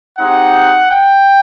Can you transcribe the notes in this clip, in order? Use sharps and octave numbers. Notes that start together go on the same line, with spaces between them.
G#3 C4 D#4 G4 F#5
G5